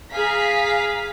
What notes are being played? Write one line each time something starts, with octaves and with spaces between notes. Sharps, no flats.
G#4 F5 A#5 B6